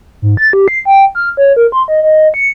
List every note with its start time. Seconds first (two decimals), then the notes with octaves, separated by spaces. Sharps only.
0.22 G#2
0.37 A6
0.53 G4
0.68 C7
0.85 G5
1.15 F6
1.37 C#5
1.56 A#4
1.72 C6
1.88 D#5
2.03 D#5
2.34 C#7